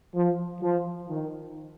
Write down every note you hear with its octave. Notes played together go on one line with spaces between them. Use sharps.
F3
F3
D#3